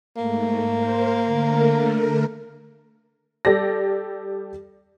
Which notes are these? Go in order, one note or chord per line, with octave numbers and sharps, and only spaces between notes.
G#2 A3 A#3
A#4 C5
D3 A3 A#4
G3 G4 A4 D5 A#6